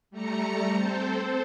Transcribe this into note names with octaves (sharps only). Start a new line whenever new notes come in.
G3 A3 A#5 C#7
C4 A4 C5